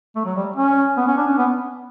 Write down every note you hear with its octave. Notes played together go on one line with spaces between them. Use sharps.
A3
F#3
G3
C#4
B3
C#4
D4
C#4
B3